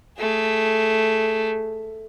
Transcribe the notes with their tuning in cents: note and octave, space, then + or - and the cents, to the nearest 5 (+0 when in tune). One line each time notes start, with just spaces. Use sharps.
A3 +0 G#4 +0